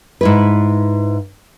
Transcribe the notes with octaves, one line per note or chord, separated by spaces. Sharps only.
G#2 E4 B4